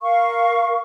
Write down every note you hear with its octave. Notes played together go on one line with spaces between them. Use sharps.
A#4 F5 C#6